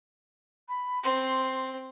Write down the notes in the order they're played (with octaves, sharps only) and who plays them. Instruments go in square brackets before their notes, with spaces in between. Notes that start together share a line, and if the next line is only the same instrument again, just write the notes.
[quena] B5
[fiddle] C4 [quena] C6